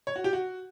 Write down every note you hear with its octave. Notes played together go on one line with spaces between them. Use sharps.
C#5
F#4
G4
F#4